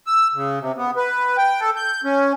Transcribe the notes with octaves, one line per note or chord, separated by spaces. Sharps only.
E6
C#3
C3
B3
B4
G5
A4
G6
C#4